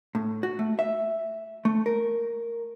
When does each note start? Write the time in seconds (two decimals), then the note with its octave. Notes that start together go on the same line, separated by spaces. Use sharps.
0.15 A2
0.43 F#4
0.59 A3
0.79 E5
1.65 A3
1.86 A#4